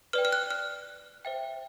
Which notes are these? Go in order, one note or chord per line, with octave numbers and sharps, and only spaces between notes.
B4 D5 G5 F6
F6
F#6
F6
C5 E5 G5